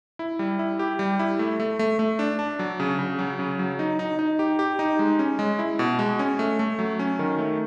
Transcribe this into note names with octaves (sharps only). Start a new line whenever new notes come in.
E4
G3
E4
G4
G3
E4
A3
A3
A3
A3
D4
D4
F#3
C#3
C#3
F#3
C#3
F#3
D#4
D#4
D#4
G4
G4
D#4
G#3
C#4
G#3
E4
B2
G#3
C#4
A3
A3
F#3
C#4
D#3
A3